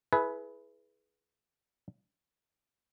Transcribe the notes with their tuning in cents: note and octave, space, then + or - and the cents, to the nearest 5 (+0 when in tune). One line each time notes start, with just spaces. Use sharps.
E4 +0 G#4 +30 B4 +0